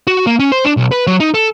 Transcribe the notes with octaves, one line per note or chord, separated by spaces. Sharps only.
F#4
A#3
C#4
C5
D4
B1
B4
F#3
D#4
A4